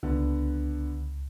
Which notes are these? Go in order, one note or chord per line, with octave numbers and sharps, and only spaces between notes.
C#2 D3 B3